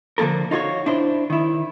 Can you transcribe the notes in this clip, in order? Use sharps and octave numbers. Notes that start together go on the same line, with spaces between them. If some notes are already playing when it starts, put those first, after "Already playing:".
D3 F3 A#3 A4 A#4
D#4 F4 F#4 C#5
D4 E4 C5
D#3 E4